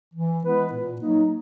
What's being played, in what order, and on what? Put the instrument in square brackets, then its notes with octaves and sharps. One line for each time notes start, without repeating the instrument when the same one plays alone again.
[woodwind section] E3
G#3 B3 E4 B4
A#2
F#3 A#3 D#4